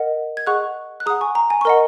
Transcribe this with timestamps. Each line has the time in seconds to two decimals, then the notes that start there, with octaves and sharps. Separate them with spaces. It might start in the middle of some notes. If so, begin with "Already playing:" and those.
Already playing: A#4 D#5 F#5
0.37 G#6
0.47 G#4 D#5 F#5 C#6 F#6
1.00 F#6
1.06 G#4 F#5 A#5 D#6
1.21 G#5 C#6
1.35 A#5
1.50 G#5
1.61 C#6
1.65 A#4 D#5 F#5 A#5